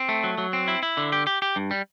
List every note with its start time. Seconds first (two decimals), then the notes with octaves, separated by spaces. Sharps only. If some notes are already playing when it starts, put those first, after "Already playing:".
Already playing: C4
0.09 A3
0.24 F#3
0.38 F#3
0.53 C4
0.68 E4
0.83 E4
0.97 D3
1.12 G4
1.27 G4
1.42 G4
1.56 G2
1.71 G3